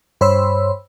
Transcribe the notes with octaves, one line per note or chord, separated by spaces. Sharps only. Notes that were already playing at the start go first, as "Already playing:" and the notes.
G2 C5 C#5 B5 C6 E6